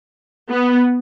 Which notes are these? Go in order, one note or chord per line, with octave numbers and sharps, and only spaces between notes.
B3